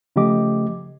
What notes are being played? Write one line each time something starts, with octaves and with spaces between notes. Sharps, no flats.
C#3 F3 A3 G4 D#5 D6